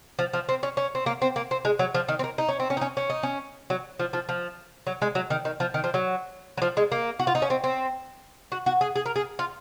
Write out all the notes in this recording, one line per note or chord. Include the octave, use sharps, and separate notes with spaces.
F3
F3
C4
C#4
C#4
C4
A#3
C4
A#3
C4
G#3
F#3
F3
D#3
C4
A#3
D#4
C#4
C4
C#4
D#4
C#4
C#4
D#4
C#4
F#3
F3
F3
F3
F#3
G#3
F#3
D#3
D#3
F3
D#3
F3
F#3
F#3
F3
G#3
A#3
F#4
F4
D#4
C#4
C4
C4
F#4
F#4
G#4
G#4
A#4
G#4
F4